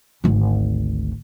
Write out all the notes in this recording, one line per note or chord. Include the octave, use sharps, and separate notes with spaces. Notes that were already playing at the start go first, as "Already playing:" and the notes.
G#1 D2